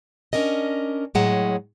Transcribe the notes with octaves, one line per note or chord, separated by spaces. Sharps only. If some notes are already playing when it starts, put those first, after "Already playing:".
C#4 D4 A#4 D#5
A2 F#3 G#3 F#5